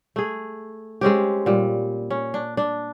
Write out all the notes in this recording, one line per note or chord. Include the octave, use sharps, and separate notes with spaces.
A3 G#4
G#3 C4 C#4 G4
A#2 G3
C#4
D4
D4